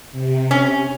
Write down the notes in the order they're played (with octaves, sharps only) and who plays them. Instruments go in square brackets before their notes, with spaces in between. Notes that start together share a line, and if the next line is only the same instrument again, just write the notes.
[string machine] C3
[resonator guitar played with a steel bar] C#4